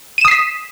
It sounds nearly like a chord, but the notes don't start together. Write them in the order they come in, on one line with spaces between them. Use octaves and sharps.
D#7 E7 D#6 C7 B6